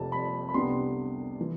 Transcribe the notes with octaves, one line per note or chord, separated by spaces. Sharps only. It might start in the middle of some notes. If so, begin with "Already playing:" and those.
Already playing: F1 F2 C3 A5
B5
B5
C2 C3 G3 B3 D4 C6
E3